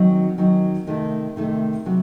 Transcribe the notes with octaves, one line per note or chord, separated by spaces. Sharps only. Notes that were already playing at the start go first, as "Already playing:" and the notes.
Already playing: D#3 F#3 C4
D#3 F#3 C4
C3 D#3 A3
C3 D#3 A3
C3 F#3 C4 F#4